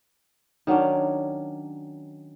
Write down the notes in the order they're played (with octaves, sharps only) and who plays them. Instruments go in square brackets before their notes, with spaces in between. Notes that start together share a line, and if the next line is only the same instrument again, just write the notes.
[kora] D#3 F#3 C#4 D4